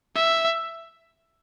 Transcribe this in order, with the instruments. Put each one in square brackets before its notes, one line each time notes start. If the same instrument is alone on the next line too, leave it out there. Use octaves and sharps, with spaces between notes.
[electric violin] E5